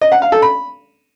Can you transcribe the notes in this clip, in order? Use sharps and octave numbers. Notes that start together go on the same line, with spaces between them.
D#5
F#5
F5
A4
B5